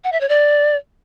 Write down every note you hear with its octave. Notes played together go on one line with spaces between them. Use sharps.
F#5
E5
C#5
D5